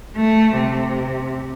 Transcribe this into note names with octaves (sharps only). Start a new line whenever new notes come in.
A3
C3